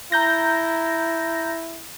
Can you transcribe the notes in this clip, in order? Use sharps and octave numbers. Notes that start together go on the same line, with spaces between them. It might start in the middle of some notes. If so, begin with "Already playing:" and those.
E4 A#5 G6 A#6